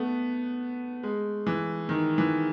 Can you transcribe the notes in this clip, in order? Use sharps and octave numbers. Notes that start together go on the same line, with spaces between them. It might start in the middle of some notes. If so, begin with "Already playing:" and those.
Already playing: A3 B3
G#3
E3
D#3
E3